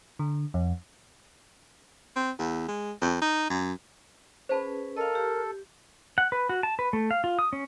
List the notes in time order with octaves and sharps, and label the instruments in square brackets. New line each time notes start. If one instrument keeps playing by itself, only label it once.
[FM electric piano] D3
F2
[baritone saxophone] C4
E2
G#3
F2
D#4
F#2
[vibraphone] C#4 G#4 B4 [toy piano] C5 A5 B5
[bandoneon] A4 [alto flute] A#4 [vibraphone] D#5 F5
[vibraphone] G4
[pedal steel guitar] F#5
B4
F#4
A5
B4
A3
F5
F4
D#6
C#4